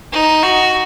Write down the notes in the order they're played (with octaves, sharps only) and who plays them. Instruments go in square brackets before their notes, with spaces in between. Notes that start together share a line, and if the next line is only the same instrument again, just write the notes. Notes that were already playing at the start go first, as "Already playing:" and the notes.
[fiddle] D#4
F#4